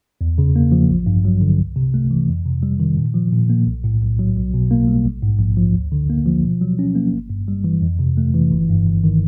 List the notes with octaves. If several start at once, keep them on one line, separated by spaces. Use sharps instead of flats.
E2
C#3
A#3
F3
A1
G2
F#3
D3
C2
C3
A3
E3
F2
C3
G3
D#3
A#2
F3
A#2
A#3
B1
A2
B1
F#3
B1
B2
A#3
G3
A#1
G#2
A#1
F3
D2
D3
A#3
F3
B2
F#3
C#4
A#3
G1
G2
G3
E3
F2
C3
A3
E3
G1
G2
G1
D#3